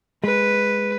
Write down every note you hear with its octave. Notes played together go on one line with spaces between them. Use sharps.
G#3 B4